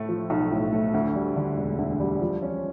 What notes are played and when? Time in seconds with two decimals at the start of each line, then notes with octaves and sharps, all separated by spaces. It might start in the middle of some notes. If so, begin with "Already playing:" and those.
Already playing: A2 A3
0.09 F3
0.30 B1
0.51 A2
0.72 A3
0.94 D2
1.15 G3
1.36 D3
1.57 E1
1.79 D2
2.00 G3
2.21 F3
2.42 C#4